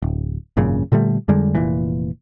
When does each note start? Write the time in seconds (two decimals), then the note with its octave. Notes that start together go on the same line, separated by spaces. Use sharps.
0.02 D1
0.57 G#1 F#2 A#2 C#3
0.92 A#2 D3 G3 A3
1.28 F2 D3 G3 G#3
1.55 F1 A#2 E3